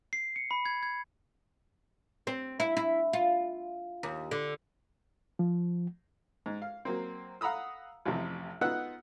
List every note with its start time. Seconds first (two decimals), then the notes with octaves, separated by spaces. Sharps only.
0.13 C7
0.36 C#7
0.51 B5
0.65 G#6
0.83 G#6
2.27 C4
2.60 E4
2.77 E4
3.13 F4
4.03 D#2
4.31 D3
5.39 F3
6.46 G#2
6.62 F5
6.85 F#3 A#3 C4
7.41 F5 F#5 A#5 B5 D#6 E6
8.05 A1 F2 C3
8.61 B3 D#4 F4 F#5 E6 F#6